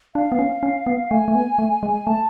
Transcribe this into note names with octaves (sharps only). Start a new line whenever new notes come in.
D4 F5
B3
C#4
C#4
B3
A3 G#5
A3
B3
A3
G#3
A3 A5